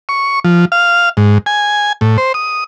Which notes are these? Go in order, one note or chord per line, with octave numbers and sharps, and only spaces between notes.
C#6
F3
F5
G#2
G#5
A2
C5
D#6